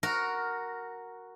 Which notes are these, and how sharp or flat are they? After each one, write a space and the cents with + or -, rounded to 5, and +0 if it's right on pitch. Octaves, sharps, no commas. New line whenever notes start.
F#4 +0 A#4 +0